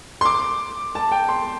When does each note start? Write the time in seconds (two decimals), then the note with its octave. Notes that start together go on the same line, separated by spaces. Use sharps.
0.21 C6
0.25 D6
0.95 A5
1.12 G5
1.29 C6